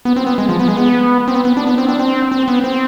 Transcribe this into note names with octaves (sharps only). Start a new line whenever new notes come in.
B3
C4
B3
G#3
F3
B3
G#3
B3
C4
B3
B3
D4
B3
C4
D4
C4
C4
B3
C4